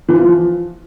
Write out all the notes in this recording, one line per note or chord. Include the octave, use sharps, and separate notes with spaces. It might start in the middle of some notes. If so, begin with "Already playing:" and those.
E3
F3
F3